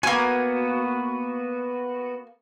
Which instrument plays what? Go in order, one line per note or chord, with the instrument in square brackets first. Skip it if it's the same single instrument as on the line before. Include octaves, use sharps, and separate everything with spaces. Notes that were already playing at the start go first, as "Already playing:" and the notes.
[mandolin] A#3 G#5 [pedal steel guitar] B3 F#4